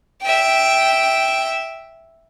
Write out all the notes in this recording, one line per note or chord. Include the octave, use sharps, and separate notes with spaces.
E5 G5